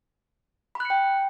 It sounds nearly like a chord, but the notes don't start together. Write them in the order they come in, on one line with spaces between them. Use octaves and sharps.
B5 F#6 C#7 G5